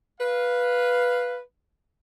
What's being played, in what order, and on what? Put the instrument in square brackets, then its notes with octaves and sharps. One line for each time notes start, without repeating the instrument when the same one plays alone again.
[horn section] B4 F5